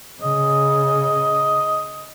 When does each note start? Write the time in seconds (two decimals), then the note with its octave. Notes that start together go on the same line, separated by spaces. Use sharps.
0.22 C#3 D#5